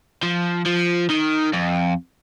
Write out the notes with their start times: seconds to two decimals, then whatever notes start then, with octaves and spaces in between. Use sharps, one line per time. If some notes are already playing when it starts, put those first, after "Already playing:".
0.23 F3
0.65 F3
1.10 D#3
1.53 F2